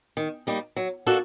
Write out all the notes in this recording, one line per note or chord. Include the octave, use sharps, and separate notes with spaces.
D#3
G3 A#3 D#4
F#3
A#3 D4 F#4 A4